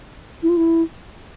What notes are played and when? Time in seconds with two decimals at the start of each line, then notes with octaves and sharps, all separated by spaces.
0.43 E4
0.49 F4
0.57 E4